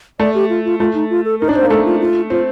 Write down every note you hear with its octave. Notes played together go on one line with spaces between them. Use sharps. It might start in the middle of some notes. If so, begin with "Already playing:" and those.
A3 D5
G4
F4
F4
A3 F4
D#4
F4
A4
D#4 A#4
D4 D5
C4 C5
A#3
A3 A4
F4
F4
C4 F4